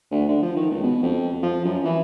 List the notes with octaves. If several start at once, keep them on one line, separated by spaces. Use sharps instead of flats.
D2
D3
F3
D#3
C#2
B2
F2
F3
F#2
E3